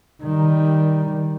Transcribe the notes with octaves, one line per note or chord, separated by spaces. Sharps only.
D#3 G3